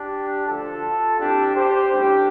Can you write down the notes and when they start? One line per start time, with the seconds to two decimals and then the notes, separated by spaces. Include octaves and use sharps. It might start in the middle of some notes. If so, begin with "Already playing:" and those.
Already playing: D4 G4
0.46 D2 D3 F3 F4 A4
1.19 C2 C3 G3 D4 G4
1.55 G4 C5
1.92 A1 A2 G3 D4 G4